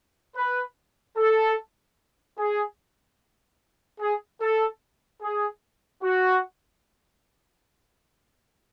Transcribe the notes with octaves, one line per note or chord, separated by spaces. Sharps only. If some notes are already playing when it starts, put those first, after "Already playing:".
B4
A4
G#4
G#4
A4
G#4
F#4